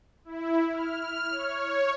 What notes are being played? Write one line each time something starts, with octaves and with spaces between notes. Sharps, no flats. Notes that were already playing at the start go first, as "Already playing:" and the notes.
E4
F6
C#5